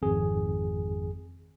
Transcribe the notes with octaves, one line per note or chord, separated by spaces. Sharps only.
G#1 F2 G#4